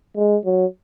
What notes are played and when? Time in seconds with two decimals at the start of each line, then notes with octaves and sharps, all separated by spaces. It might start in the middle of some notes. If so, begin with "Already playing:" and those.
0.17 G#3
0.45 F#3